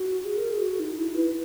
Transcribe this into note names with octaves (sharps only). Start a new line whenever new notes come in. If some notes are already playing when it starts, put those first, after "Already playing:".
Already playing: F#4
G#4
A#4
G#4
F#4
D#4
E4
B4